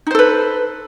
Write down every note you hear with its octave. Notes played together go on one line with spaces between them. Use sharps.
D#4 A4 B4 C5